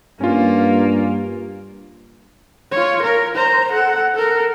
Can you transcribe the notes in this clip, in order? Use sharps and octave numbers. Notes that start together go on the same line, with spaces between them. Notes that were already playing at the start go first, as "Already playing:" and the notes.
G2 A#3 C#4 F4
F4 C#5
A#4
C5 A#5
A4 F#5
A4 A#4